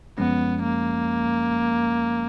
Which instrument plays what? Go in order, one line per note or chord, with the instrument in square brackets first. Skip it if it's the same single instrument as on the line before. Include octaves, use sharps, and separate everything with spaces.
[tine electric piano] F#2 F3 G#3 C#4 [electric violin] B3
[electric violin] A#3